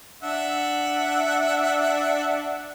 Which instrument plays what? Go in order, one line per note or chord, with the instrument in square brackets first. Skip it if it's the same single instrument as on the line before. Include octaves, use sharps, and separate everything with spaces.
[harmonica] D4 E5 F#5